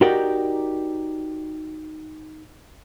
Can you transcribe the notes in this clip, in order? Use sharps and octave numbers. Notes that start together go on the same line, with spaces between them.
D#4 F#4 G4 A#4 D5